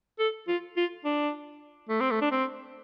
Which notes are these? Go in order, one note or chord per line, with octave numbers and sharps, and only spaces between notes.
A4
F4
F4
D4
A3
C4
A3
D4
C4